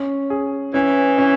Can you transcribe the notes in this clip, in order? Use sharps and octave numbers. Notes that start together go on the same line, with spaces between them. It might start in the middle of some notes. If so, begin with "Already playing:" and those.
Already playing: C#4
G#4
E3 C#4
C#4